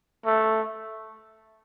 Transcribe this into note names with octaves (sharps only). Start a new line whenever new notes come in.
A3